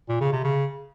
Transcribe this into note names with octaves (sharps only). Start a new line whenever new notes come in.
A#2
C#3
C3
C#3